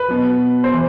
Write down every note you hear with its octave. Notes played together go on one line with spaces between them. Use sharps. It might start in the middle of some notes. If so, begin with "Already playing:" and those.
Already playing: B4
B2 F#3
C5
E3